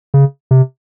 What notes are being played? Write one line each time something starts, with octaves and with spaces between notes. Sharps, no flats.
C#3
C3